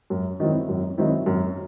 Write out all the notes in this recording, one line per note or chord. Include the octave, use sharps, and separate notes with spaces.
F#2
D#3 F#3 C4 E4
F#2
D#3 F#3 C4 E4
F#2